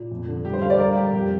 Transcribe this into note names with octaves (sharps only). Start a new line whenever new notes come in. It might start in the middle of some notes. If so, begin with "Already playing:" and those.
Already playing: A#2
F2
D3
G3 G4
C5
D3 F5
D5
G3 A#4
G3 G4
F2 G4